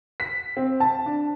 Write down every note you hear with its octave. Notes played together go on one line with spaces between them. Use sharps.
B6
C4
A5
D4